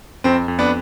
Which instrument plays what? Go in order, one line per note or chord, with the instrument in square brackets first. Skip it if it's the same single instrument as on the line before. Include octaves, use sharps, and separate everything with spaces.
[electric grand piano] F2 [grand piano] C4
[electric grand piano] F2
[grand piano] B3 D4